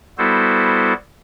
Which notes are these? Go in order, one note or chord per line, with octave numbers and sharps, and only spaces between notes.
G3 B3 E4 F#4 A4 C5